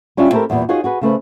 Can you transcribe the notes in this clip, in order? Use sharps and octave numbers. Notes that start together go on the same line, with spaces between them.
G3 C#4 D4 F4 E5 G5
A3 C4 E4 G4 A4 A#4
E2 A#2 G3 B3
D#4 F4 F#4 G#4 C#5
F#4 G#4 B4
C#3 A3 B4 C5